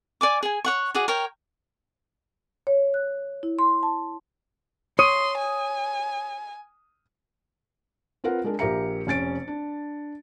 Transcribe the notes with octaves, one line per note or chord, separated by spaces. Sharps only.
D5 G#5 D6
G#4 G#5
C#5 F#5 C#6
F#4 G#4 D5 G#5
A#4 C#5 G5
C#5
F#6
E4
C6
A5
C#5 C6 D#6 D#7
G#5
C4 F4 A#4 B4 F#5
G#3 D4 A#4
A#1 G4 A#4 E5 A#5 C#7
F1 C#4 A6 D7
D4